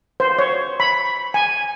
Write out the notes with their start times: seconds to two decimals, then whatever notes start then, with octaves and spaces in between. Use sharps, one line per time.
0.20 C5
0.39 C#5
0.80 B5
1.34 G#5